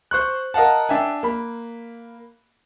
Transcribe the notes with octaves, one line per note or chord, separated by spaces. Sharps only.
C5 C#6 F#6
A#4 D#5 F5 F#5 A5
D4 E5 G5 G#5
A#3 B5